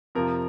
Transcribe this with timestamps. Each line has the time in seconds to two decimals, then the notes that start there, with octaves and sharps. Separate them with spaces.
0.15 F2 C3 F3 A#4